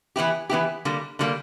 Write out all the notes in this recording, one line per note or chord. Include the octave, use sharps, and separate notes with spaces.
E3 B3 E4 G4
E3 B3 E4 G4
D3 G3 A#3
D3 G3 A#3